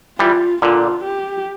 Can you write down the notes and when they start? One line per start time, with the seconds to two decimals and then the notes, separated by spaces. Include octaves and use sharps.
0.19 E3 G3 F4
0.62 A#2 D3 F4
1.04 G4